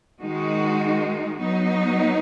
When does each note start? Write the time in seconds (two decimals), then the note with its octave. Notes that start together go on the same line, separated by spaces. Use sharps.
0.21 D#3 G#3 D#4 F#4
1.38 F#3 B3 D#4